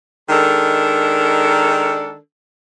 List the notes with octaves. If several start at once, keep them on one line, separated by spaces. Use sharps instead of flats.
D#3 G#3 D4 A4 A#4